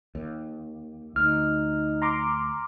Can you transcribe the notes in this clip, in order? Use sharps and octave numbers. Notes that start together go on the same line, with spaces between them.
D#2
D2 D#4 F6
A#5 C6 D6